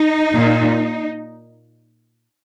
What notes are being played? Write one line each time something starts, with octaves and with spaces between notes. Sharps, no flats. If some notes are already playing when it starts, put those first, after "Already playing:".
Already playing: D#4
A#2